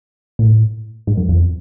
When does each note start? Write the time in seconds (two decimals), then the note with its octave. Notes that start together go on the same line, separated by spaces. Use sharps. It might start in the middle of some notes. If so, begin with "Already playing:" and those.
0.39 A#2
0.44 A2
1.07 G#2
1.17 F#2
1.29 F2